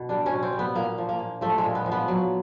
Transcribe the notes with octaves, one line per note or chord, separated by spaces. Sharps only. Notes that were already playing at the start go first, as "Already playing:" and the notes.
Already playing: B2
G3 D4
C#4
B2
C4
G3
B3
A#2 A#3
F3
A#3
A#2
F3 A3
G#3
A#2
B3
F3
B3
F#3